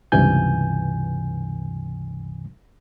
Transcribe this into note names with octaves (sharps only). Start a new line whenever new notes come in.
C#2 G2 C3 E3 G#5 G6